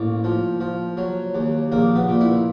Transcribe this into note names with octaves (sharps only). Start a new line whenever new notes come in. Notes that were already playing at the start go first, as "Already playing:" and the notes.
Already playing: A1 A#3
F3
F3
F#3
D#2
A#1 A#3
B3
A#2
E4